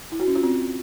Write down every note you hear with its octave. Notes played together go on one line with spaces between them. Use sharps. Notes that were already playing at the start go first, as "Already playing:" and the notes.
E4
F#4
C#4
F4
C4